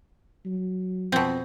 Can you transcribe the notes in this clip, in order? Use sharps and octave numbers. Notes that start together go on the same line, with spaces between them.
F#3
F2 B2 C4